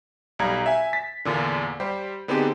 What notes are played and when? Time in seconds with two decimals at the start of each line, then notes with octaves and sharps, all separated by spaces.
0.39 B1 G3 A#5 G#6
0.66 E5 G#5
0.93 A6 B6
1.25 E2 A#2 D3
1.80 G3 G4 C5
2.28 D3 B3 C4 D#4 G4 G#4